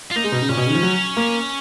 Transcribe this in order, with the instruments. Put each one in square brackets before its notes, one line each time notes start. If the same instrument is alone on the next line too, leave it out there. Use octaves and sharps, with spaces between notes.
[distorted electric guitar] F4
[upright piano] A#3 [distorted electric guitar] D#4
[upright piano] G#3
B2
C#3
[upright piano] A#2 [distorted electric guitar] C#4
[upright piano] B2
C#3
D#3
F3
F#3
A#3